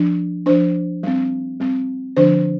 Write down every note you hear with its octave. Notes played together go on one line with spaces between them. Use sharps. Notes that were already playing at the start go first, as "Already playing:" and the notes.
Already playing: F3 D4
F3 D4 C5
G3 C4
G3 C4
D3 F3 D4 C5